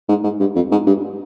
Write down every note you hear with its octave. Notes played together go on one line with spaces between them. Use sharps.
G#2
G#2
G2
F2
G#2
G2